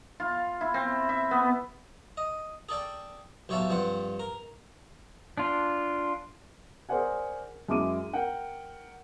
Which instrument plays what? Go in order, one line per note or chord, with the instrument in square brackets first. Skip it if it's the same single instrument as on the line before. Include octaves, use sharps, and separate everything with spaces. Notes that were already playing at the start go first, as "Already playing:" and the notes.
[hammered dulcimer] F4
E4
C4
E5
B3
[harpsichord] D#5
G#4 A4 D5 G5
B1 G4 C#5 E5 F5 A5
G2 F3 G3 C4 F#5
A#4
[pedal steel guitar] D4 F4
[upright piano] G#4 A#4 C5 D5 F#5 G#5
F#2 G#3 E4 G#4 D6 D#7
A#4 F#5 G5